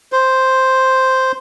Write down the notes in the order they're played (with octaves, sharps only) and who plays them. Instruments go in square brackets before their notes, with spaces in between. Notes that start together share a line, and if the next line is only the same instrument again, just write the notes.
[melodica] C5